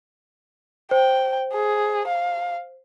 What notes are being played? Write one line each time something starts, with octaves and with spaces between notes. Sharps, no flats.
C5 G5
G#4
F5